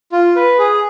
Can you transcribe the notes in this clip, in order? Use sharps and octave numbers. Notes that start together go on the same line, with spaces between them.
F4
B4
G#4